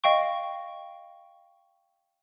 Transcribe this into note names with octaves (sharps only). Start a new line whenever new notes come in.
D#5 F5 G5 C#6